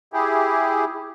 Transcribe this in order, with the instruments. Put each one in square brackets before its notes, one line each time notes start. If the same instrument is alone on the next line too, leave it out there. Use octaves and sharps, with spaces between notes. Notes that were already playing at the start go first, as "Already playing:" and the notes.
[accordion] E4 G4 G#4